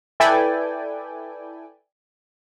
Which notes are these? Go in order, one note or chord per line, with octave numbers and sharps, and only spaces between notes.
E4 A4 B4 D5 G5 G#5